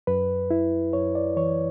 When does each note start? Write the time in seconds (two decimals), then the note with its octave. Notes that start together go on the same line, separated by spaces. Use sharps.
0.07 F#2 B4
0.51 E4
0.93 F#2 C#5
1.15 D5
1.37 E3 C#5